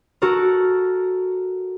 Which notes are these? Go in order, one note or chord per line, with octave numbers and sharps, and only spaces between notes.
F#4 A4 A#4